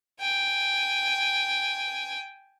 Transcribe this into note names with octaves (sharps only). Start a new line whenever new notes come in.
G5 G#5